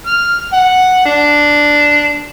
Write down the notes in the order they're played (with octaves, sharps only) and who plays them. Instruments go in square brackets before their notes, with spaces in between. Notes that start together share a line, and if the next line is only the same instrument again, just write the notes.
[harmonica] F6
F#5
D4